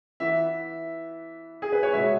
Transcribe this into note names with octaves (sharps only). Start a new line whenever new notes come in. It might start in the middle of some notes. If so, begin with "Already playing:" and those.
E3 B3 E5
G#4
B4
C#5
B2 G#3 B3 E5